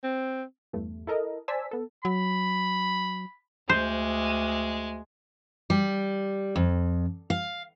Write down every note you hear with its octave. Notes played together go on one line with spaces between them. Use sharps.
C4
E2 G2 A3
E4 A4 A#4 D#5
C5 D5 G#5 A5 E6 B6
B3 A4
F#3 B5
D2 G#3 C5
G3
F2
F5